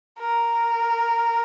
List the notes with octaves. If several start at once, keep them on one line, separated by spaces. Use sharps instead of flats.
A#4